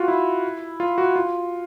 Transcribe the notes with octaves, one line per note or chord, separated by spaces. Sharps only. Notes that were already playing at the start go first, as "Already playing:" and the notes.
Already playing: F4 F#4
E4
F4
F#4
F4